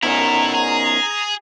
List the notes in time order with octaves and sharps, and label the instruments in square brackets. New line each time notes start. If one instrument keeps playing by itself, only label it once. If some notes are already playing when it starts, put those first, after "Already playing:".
[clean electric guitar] B2 D#3 C#4 [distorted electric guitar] E4 A4 [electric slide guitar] A#5
[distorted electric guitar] G#4